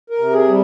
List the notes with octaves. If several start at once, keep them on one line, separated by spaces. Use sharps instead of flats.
A#4
C3
G#4
G3